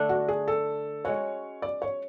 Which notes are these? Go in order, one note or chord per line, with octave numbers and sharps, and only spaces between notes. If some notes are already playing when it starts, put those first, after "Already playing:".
Already playing: D3 A3 D4
F#4
G#4
A4
G#3 C#4 F#4 C#5
D5
C#5